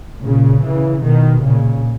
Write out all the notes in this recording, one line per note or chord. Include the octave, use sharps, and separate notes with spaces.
A#2 C#3
C#3 E3
B2 D#3
A#2 C#3